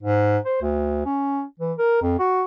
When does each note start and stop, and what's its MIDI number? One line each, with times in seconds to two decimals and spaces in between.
0.03 0.38 44
0.45 0.57 72
0.62 1.05 38
1.06 1.43 61
1.60 1.73 52
1.78 1.99 70
2.02 2.18 41
2.19 2.45 66